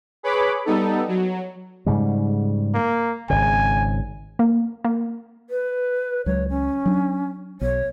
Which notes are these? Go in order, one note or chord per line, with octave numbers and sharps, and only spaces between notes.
G#4 B4 C#5 B5 D6
G3 B3 D#4 A4
F#3
G#2 C#3 G3
A#3
G#1 C#3 G#5
A#3
A#3
B4
C#2 F#3 C#5
C#4
F#3 D4
B1 C#5